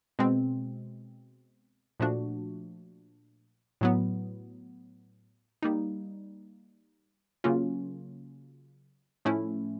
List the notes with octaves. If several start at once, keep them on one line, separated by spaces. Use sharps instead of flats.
B2 G#3 C4
A#2 F3 A3 D4 F#4
A2 F#3 B3
G3 A#3 D#4
C#3 F#3 A#3 C#4 F4
A2 F3 A3 C#4 E4